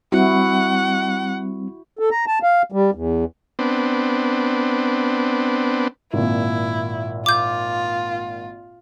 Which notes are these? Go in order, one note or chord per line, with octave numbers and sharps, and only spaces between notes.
G3 C4 E4 F#4 F#5
A4
A#5
A5
F5
G3
E2
B3 C4 D4
G#1 A#2 E4
F4 D6 G6